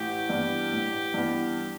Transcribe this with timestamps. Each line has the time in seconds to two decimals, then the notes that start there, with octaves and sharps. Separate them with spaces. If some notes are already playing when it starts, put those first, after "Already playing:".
Already playing: A1 G4
0.29 G2 E3 B3
0.72 A1
1.14 G2 E3 B3